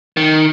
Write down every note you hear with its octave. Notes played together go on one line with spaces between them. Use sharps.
D#3